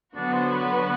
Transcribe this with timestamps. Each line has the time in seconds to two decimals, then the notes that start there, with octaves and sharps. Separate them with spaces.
0.15 D3 F#3 B3 D4 F#4
0.33 C5
0.52 B4
0.71 B4